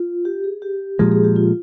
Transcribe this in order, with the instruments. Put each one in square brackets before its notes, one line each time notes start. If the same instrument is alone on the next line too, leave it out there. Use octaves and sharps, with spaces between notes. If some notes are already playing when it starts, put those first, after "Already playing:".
Already playing: [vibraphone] F4
G4
G#4
G4
[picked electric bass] A#2 F3 G#3 [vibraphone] G4
[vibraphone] G#4
G4
F4